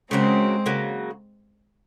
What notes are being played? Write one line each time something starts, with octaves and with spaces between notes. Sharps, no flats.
C#3 F#3 G#3 A#3 C4
C#3 F#3 A#3